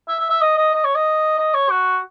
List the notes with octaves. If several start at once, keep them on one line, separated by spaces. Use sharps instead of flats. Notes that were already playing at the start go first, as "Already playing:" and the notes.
E5
E5
E5
D#5
D#5
D#5
C#5
D#5
D#5
C#5
F#4